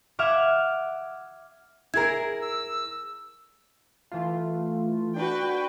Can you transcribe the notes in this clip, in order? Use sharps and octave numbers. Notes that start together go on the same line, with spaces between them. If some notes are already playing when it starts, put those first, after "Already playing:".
E5 F#5 D6 F6 G#6
E4 G#4 A#4 G#6
E6
E3 A3 F4
D4 F#4 B4 G5